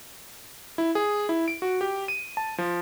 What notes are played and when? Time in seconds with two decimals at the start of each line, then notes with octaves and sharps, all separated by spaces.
0.78 E4
0.95 G#4
1.29 E4
1.48 D7
1.62 F#4
1.81 G4
2.08 D#7
2.37 A5
2.58 F3